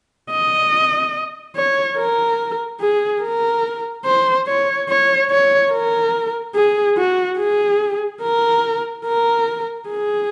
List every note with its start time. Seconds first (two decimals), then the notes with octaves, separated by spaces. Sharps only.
0.30 D#5
1.56 C#5
1.97 A#4
2.81 G#4
3.22 A#4
4.05 C5
4.47 C#5
4.89 C#5
5.31 C#5
5.72 A#4
6.55 G#4
6.97 F#4
7.39 G#4
8.22 A#4
9.06 A#4
9.89 G#4